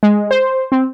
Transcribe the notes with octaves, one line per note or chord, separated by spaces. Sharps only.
G#3
C5
C4